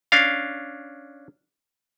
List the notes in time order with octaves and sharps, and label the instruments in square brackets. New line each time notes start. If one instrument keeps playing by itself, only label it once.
[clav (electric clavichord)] C#4 D4 F5